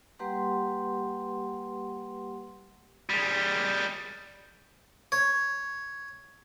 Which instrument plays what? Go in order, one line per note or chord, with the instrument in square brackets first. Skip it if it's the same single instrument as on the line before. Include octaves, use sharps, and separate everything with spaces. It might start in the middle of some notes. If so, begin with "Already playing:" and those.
[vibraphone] G3 A#3 G4 B4 F#5 C6
[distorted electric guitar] G3 G#3
[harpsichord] C#5